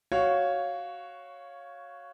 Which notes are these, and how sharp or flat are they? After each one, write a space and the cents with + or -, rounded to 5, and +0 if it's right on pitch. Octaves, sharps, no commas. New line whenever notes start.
F#4 +10 C#5 +0 F5 +0